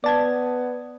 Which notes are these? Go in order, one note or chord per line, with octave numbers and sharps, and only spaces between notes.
B3 D5 A5 G#6